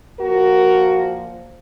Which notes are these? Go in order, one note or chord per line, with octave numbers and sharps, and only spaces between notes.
A#2 F3 A#3 F#4 A#4